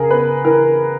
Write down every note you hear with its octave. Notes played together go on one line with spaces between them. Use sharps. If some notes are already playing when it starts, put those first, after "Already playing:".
Already playing: C#3 G#4 A#4
B3 B4
E3 A#4